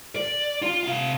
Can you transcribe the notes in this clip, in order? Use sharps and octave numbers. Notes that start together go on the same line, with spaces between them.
D5
F4
C3 F5